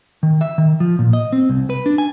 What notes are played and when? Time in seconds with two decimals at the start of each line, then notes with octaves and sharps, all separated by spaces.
0.23 D#3
0.41 E5
0.58 D#3
0.80 F3
0.99 A#2
1.13 D#5
1.33 C4
1.50 C2
1.70 B4
1.86 D4
1.98 G#5